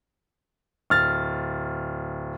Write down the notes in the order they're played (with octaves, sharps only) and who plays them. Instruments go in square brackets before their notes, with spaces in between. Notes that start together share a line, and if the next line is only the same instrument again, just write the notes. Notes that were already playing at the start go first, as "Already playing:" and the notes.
[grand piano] D1 F6 A6